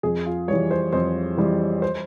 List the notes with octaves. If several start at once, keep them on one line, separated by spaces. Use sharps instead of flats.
F2 G#4
F4
E3 G3 C#5
C5
F2 C5
E3 G3
C5